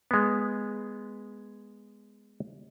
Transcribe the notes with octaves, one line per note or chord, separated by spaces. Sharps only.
G#3 B3